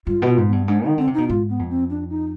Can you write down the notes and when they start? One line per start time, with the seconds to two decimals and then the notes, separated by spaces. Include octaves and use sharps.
0.07 G2 F4
0.22 B2
0.28 F4
0.37 G#2
0.48 G2 B3
0.68 G#2 D4
0.84 D#3 D#4
0.98 D3 C4
1.07 C3
1.14 B2 D#4
1.28 G#2 F4
1.49 B3
1.59 F2
1.70 C4
1.90 D4
2.10 D#4